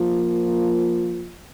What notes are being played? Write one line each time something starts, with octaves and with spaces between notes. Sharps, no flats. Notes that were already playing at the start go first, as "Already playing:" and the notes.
Already playing: F3 A#3 F4